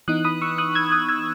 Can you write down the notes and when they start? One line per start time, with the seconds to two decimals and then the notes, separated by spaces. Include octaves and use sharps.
0.08 E3 B3 D#4 D#6 F#6
0.25 B5 D#6
0.42 C#6 E6
0.58 D#6 F#6
0.75 E6 G#6
0.91 D#6 F#6
1.09 E6 G#6